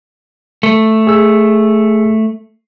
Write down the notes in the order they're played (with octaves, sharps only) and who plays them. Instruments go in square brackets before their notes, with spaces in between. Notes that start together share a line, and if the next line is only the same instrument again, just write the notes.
[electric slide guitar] A3
[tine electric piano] G#4 E6